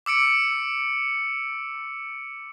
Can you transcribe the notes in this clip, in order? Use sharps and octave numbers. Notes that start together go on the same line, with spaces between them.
D6 E6 C#7 D7